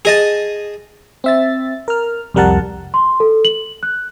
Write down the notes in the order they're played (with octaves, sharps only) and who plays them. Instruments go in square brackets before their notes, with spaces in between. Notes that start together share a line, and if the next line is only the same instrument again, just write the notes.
[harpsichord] G#4 D#5 A5
[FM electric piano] C4 E5 A6
A#4 F6
C2 F2 G3 A#4 F#5 A5
[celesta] C6
A4
F#7
F#6